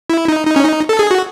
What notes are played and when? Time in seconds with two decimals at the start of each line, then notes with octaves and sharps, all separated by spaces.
0.10 E4
0.28 D#4
0.47 D#4
0.56 C#4
0.65 D#4
0.89 A4
0.99 G#4
1.11 F#4